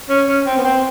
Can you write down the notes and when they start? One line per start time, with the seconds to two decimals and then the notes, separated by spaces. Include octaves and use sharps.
0.09 C#4
0.27 C#4
0.45 C4
0.58 B3
0.64 C4